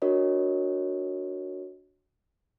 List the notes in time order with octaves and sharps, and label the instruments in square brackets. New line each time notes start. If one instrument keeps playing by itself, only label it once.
[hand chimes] D4 F#4 A#4 C#5 D#5